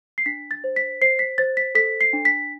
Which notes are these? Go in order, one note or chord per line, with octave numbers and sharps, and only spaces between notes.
C7
D4 B6
A6
C5
B6
C5 C7
B6
C5 A6
B6
A4 B6
C7
D4
B6